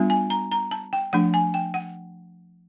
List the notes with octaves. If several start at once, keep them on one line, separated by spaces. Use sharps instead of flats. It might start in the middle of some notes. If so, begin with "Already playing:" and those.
Already playing: G3 B3 D4 F4
G#5
A#5
A#5
A5
G5
F3 A3 D4 F#5
G#5
G5
F#5